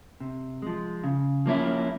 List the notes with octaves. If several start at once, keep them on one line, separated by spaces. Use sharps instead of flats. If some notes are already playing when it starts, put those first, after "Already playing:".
C3
F3 G#3
C#3
F3 A#3 C#4 E4